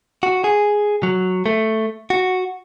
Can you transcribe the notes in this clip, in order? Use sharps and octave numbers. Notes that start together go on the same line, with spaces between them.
F#4
G#4
F#3
A3
F#4